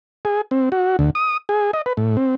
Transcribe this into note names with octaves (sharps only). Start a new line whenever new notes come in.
G#4
C4
F#4
D2
D#6
G#4
D#5
B4
A2
C4